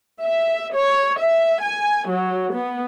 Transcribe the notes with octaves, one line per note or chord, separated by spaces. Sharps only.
E5
C#5
E5
G#5
F#3
B3